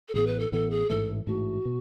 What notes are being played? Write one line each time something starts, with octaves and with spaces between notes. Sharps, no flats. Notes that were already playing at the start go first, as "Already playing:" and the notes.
A4
A1 A2 E3 B3 G#4
B4
A4
A1 A2 E3 B3 A4
G#4
A1 G#2 E3 A3 A4
A1 G#2 E3 A3 F#4
B2